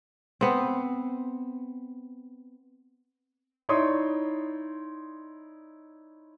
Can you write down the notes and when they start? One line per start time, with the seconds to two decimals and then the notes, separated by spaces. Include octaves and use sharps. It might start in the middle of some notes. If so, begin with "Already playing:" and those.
0.41 B3 C4
3.69 D#4 E4 C#5 D5 C6 D#6